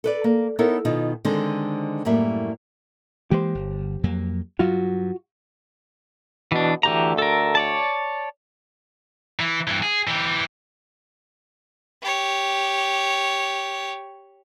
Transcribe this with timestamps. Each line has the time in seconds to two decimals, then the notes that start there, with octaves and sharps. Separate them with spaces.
0.04 A4 B4 D5
0.24 A#3
0.59 B3 D#4 E4 A4 A#4 C#5
0.85 B2 D#3 D#4 F4
1.25 D3 D#3 G#3 C4 C5
2.05 F#2 A2 G3 A#3 E5
3.31 E3 G#3 A#3 G4 C5
3.55 G1
4.04 F2 F#3 A#3
4.59 G2 F#3 F4 F#4
6.52 B2 E3 D4
6.83 D2 E3 G4 A#5
7.18 A4 A#4
7.55 C#5 D5 A5
9.40 E3
9.68 G2 E3
9.83 G#4
10.08 E3 G4
12.02 G4 C#5